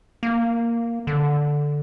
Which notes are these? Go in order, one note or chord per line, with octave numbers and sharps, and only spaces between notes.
A#3
D3